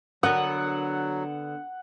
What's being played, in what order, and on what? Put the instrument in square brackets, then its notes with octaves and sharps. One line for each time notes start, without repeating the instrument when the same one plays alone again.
[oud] D3 B3 A#4 [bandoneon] F#3 [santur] F#5